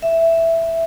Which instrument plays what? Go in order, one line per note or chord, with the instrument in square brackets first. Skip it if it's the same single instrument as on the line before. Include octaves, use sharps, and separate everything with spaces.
[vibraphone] E5